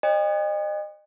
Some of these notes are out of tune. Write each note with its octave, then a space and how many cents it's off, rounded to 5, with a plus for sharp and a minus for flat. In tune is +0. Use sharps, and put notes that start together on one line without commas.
C5 +45 D#5 -35 G5 +45